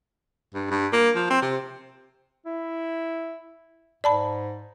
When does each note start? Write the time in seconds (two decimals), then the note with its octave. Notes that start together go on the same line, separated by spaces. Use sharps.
0.54 G2
0.71 G2
0.93 A#3
1.16 F3
1.30 C4
1.42 C3
2.46 E4
4.04 G#2 D5 A5 B5